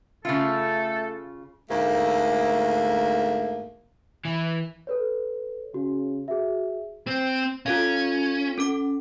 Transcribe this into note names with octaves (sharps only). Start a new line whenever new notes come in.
C#3 A3 F4 A4
D2 G#2 A3 A#3
E3
A4 B4 C#5
C#3 F#4
F#4 G#4 E5
C4
C#4 F4 A4 F5
C#4 A4 D6